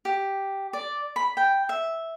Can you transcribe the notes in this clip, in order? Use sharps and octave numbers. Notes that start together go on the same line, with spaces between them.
G4
D5
B5
G5
E5